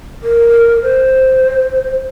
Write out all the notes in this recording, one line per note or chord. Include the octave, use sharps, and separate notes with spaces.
A#4
C5